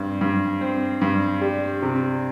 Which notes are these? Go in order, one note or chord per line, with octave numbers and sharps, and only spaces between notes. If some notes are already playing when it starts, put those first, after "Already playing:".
Already playing: G2 C4
G2
C4
G2
G3
C3